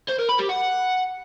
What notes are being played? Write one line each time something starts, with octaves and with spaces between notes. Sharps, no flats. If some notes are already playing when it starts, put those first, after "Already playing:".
C5
A#4
B5
G4
F#5